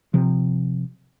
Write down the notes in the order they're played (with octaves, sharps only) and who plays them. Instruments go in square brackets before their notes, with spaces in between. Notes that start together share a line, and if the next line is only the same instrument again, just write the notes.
[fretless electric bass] C3 F3